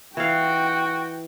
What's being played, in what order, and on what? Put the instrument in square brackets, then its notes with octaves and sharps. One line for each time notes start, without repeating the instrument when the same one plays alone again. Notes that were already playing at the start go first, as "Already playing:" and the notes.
[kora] E3 F5 [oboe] F#4 [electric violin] G5